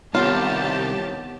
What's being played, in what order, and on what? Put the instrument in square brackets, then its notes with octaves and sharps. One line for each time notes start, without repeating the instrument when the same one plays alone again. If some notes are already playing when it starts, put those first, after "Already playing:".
[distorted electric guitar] C2 [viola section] D#3 G4 A5 [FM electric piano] B3 C#5 F#5 [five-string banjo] F4